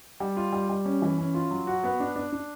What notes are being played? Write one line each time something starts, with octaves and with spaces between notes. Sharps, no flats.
G3
F4
G3
G3
C#4
E3
C#4
F4
F#3
F#4
B3
D4
D4
D4